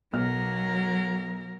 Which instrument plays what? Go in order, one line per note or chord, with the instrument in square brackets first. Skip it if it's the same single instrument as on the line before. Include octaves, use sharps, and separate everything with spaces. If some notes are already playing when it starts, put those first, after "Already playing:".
[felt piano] B1 B2 F6 [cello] F#3 A#4